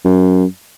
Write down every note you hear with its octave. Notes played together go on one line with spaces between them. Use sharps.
F#2